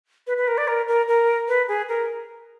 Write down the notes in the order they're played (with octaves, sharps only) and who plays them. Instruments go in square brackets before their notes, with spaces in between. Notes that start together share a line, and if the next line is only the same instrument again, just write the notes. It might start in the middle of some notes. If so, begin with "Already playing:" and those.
[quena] B4
B4
A#4
D5
A#4
A#4
A#4
B4
G#4
A#4